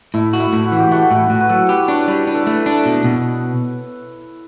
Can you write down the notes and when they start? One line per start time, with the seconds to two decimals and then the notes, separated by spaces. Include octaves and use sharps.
0.14 A2 E4
0.33 F#4
0.40 E4
0.53 A2
0.65 F#4
0.72 E3
0.80 G4
0.91 A3 F#4
1.11 A2 E4
1.30 A2 F#4
1.40 B4
1.49 F#3 A4
1.69 G4 B4
1.88 D4 C#5
2.08 G3 B4
2.27 D4 B4
2.35 A4
2.42 A3 B4
2.66 D4
2.86 B2
3.04 B2